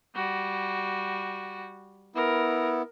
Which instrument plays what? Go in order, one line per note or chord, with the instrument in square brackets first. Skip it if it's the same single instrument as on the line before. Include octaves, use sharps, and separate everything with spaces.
[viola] G3 F#4
[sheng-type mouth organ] B3 E4 [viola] A#4